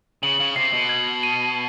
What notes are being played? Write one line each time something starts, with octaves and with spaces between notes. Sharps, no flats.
C#3 F#7
C#3
C3 C7
B2
G#6
D#7